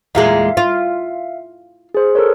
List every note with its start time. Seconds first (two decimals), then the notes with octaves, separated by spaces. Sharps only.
0.15 E2 A#2 G#3 E5 F5
0.57 F4
1.94 G#4 C5
2.15 A4 A#4 C#5